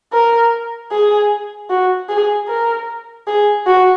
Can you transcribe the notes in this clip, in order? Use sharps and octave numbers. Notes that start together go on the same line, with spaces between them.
A#4
G#4
F#4
G#4
A#4
G#4
F#4